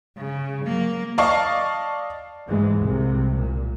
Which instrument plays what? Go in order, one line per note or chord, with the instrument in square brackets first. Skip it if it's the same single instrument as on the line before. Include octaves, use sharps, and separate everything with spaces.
[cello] C#3
F#3 A#3
[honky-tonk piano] D5 D#5 F5 A5 C#6
[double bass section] G#2 E3 G#3
C2 C3
A#2